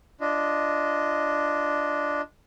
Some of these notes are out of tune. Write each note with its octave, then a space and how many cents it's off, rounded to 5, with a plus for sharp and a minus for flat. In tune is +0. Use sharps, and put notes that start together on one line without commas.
D4 +0 F4 -20 D#5 +0